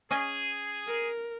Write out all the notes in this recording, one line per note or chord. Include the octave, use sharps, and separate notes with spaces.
C#4 G#4 D#5 G#5
A#4